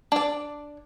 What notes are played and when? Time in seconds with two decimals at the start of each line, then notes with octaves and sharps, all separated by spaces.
0.12 D4 D5